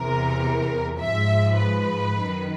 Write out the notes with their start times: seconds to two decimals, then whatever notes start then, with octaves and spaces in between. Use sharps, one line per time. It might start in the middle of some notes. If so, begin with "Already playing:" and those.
Already playing: E2 C3 E3 A#4
0.98 G#2 F3 E5
1.57 B4
2.16 F#2 D#3